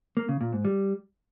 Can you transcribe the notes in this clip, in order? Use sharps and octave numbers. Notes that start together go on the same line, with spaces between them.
A#3
C#3
A#2
G#2
G3